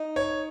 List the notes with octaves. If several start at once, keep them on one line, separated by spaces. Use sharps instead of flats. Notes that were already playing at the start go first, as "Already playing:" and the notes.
Already playing: D#4
C#5